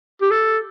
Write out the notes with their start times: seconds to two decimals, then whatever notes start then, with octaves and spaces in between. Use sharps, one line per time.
0.22 G4
0.31 A4